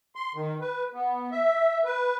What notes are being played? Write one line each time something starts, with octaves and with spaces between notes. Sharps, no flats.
C6
D#3
B4
B3
E5
B4